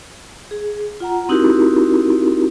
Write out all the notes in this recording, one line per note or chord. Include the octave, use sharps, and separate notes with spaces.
G#4
F4 F#5 A#5
C4 D#4 E4 F#4 G4 A#4